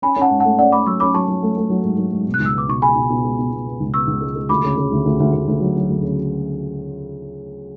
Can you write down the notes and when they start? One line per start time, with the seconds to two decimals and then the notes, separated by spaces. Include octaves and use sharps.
0.02 C#4 G#5 B5
0.16 C#4
0.22 F#5 A5
0.30 G#2
0.40 A3 F#5 A5
0.59 C#4 D5 F#5
0.72 A3 B5 D6
0.86 F#3 C#6 E6
1.00 C#4 B5 D6
1.14 F#3 A5 C#6
1.28 F#3
1.43 A3
1.57 A3
1.70 F#3
1.84 G#2
1.98 F#3
2.13 G#2
2.27 B2
2.34 F#6
2.40 C#2
2.46 E6
2.54 B3 D6
2.69 B2 C#6
2.82 G#3 G#5 B5
2.96 B2
3.10 B2
3.24 G#3
3.39 B2
3.53 B2
3.67 B3
3.80 C#2
3.94 B3 C#6 E6
4.07 C#2
4.21 G#3
4.35 G#3
4.49 D2 B5 D6
4.64 C#3
4.77 C#3
4.92 D2
5.06 D2
5.20 D2
5.33 D2
5.48 D2
5.61 F#3
5.76 F#3
5.90 D2
6.03 C#3